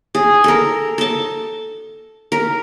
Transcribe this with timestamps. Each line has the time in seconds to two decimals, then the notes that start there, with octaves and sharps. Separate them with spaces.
0.15 G#4
0.44 A4 A#4
0.98 A4 A5
2.32 A#4